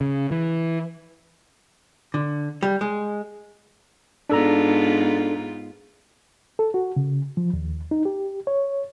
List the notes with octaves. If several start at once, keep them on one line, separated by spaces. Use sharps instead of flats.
C#3
E3
D3
G3
G#3
G#2 B3 D4 F4 A4 A#5
A4
F#4
C#3
F3
D#2
D#4
G4
C#5